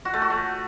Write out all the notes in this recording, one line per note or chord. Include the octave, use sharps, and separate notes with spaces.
F#4
A3
F#4
A3